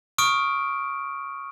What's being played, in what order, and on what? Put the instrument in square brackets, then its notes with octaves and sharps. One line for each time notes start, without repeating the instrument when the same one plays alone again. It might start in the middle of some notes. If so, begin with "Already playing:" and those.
[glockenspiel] C#6 D#6 F6 D7